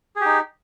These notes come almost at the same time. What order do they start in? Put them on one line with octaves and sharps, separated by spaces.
G#4 G4 D#4